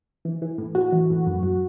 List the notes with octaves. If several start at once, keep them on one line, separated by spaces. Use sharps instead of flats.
E3
E3
A2
A2 F#4
E3
A2
F#2
F#2